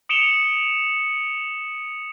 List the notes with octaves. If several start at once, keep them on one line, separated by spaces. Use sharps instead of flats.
D#6 C#7 D7 E7 F7 G7